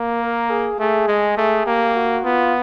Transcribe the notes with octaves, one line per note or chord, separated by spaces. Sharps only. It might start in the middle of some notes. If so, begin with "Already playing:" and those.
Already playing: A#3
A#4
G#4
A3 G#4
G#3
A3 G#4
A#3 G4
F#4
B3 F4